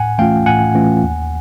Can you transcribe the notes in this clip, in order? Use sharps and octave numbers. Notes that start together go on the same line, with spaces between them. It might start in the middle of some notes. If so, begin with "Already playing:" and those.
Already playing: A2 F#5 G#5
E3 A3 C#4 F4 F5 G5
A2 F#5 G#5
E3 A3 C#4 F4
D#2